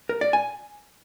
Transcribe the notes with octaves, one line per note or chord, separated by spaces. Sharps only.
A#4
D5
G#5